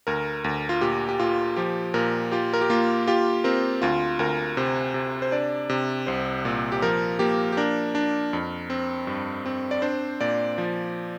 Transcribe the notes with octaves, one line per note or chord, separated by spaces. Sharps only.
D2 A#4
D2
F4
A#2 G4
G4
A#2 F4
F3 G4
A#2 A#4
F4 G4
A#4
G4
A#3 F4
F4 G4
C4 A#4
D2 F4
D2 A#4
C3 C5
C3
C5
D4 D5
C3
C2 C5
A#2
G4
F3 A#4
A#3 G4
G4
D4 A#4
D4
F2
C4
G2
C4
D5
D4 C5
A#2 D5
F3